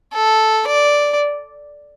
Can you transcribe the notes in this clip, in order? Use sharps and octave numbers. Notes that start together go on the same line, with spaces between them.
A4
D5